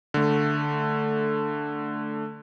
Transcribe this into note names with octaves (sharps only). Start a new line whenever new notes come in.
D3 A3